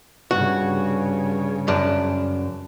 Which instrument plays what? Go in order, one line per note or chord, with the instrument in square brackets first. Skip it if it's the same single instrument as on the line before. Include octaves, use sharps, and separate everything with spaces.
[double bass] G2 C#3 [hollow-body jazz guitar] F#4
[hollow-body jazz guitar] F#2 D4